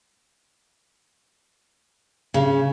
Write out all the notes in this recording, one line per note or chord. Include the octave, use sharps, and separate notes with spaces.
C#3